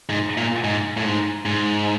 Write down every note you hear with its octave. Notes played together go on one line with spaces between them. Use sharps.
G#2
A#2
G#2
A2
G#2
G#2